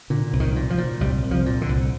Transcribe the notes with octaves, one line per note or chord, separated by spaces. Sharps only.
A#2 D3
C2
D#3
A#2
F3
A#2
C2 G3
C2
F3
A#2
D3
C2